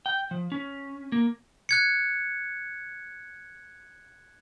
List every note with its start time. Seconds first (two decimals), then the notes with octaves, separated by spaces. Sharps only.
0.06 G5
0.31 F3
0.52 C#4
1.12 A#3
1.69 F#6 G#6 C#7